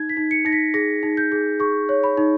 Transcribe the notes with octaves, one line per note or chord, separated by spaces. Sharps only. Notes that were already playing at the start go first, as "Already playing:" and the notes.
Already playing: D#4 G#6
B6
D#4
C#7
D#4 A#6
B6
G#4 A#6
D#4
G6
G#4
G#4 C#6
C#5
B5
D#4